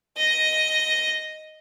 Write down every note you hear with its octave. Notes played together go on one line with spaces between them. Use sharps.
D#5